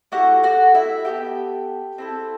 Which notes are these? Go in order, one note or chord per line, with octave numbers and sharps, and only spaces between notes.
A3 E4 F#4 G4 F#5
F#4 F#5
E4 E5
B3 F#4 G4 A4 G5
C4 E4 A4